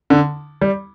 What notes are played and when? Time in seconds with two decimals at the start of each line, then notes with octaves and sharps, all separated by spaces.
0.10 D3
0.61 G3